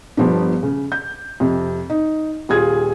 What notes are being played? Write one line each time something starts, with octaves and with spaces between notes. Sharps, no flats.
G1 F3 B3 D4
C#3
G6
F2 C3
D#4
D#1 F4 G#4 G#6